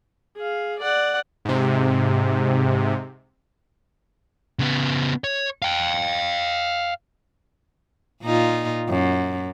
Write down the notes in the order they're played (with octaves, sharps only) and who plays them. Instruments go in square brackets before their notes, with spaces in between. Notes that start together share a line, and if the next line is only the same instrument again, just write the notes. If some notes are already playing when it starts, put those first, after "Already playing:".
[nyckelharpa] G#4 F5
D5 F#5
[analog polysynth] G#2 C3
[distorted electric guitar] C#3 B3
C#5
F5 G5
[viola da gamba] A#2 D#4 F4
F#2